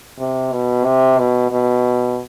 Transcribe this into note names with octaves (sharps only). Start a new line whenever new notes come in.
C3
B2
C3
B2
B2